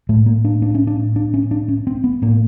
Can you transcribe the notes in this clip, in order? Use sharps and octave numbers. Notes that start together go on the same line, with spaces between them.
A2 A3
A#3
D4
D4
C#4
D4
D4
C#4
D4
C#4
C4
B3
A2 A#3